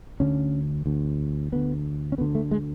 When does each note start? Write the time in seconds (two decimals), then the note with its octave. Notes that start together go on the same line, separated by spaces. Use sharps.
0.20 D2 D3 C#4
0.86 D2 D3
1.52 D2 D3 B3
2.12 C#4
2.18 D2 B3
2.21 D3
2.35 A3
2.51 G#3